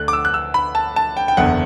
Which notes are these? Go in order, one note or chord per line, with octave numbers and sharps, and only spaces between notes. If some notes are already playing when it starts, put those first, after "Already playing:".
Already playing: D2 D3 F#6
D6
E6
F#6
E6
B5
A5
A5
G5
G5
F#1 E2 D3 F#5